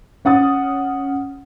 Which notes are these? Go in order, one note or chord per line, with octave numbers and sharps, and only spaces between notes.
C#4 F#5 D#6 A6